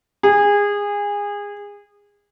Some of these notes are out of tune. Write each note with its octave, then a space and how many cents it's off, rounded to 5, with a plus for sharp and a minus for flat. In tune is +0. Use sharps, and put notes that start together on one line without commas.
G#4 -25